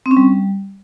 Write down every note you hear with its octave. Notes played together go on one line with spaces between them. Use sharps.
C4
C#4
G3